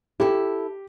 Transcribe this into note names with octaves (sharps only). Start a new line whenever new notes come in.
E4 G4 A4